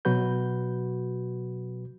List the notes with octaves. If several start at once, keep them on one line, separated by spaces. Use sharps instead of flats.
B2 F#3 F#4 B4 G6